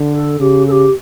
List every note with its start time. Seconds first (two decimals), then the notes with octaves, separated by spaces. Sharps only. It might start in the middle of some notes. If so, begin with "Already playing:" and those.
Already playing: D3
0.13 A4
0.40 C#3 G4
0.67 A4
0.71 G4